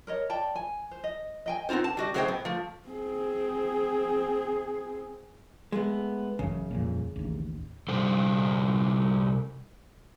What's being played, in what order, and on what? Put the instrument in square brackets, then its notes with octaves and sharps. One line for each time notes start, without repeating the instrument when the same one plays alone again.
[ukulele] A#4 C#5 D#5
D5 G5 A5
G#5
C5
D#5
D#5 G5 G#5
[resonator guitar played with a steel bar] B3 C4 D#4 F4 C5
A5
G3 F#4 D#5
A2 F#3 G#4 C5 D#5 G5
B3
F3 A3
[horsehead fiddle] C4 G#4
[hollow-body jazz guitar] G#3 A3 B3
[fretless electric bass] A1 F#2 [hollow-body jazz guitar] C#3
[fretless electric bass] D#1 F2 A#2
A1 D#2
[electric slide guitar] C3 G3 A4 C5